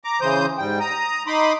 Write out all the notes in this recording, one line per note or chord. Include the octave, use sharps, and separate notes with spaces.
A#5 D6
C#3 E3 C5 D#6 G6
G#2 G3 G5
A#5 D#6
D#4 B5 C6 D6 D#6